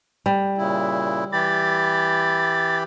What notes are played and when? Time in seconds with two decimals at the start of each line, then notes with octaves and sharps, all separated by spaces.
0.26 G3
0.58 A#2 C#3 E4
1.32 E3 G4 B5 A6